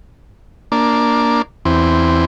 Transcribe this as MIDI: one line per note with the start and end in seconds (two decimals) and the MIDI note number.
0.72 1.42 58
0.72 1.42 62
1.65 2.25 40
1.65 2.25 60